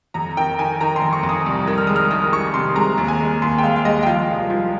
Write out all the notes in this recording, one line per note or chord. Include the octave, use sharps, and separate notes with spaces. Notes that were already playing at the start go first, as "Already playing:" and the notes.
F2 A#5
D#3 G5
D#3 G#5
D#3 A#5
C6
F2
C#6
F2
D#6
C2
D#3
F6
G#3 D#6
F6
D#3 D#6
D#3 C#6
C3 C6
G#3 A#5
D#2
G#5
G#3
D#2 C6
G5
G#3 F5
F5
G#3 D#5
G5
F3 F5
C2
F3